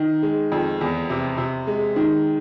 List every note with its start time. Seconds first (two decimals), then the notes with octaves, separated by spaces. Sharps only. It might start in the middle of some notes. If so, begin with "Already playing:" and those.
Already playing: D#3
0.23 G#3
0.52 F2
0.81 E2
1.10 C3
1.38 C3
1.67 G#3
1.96 D#3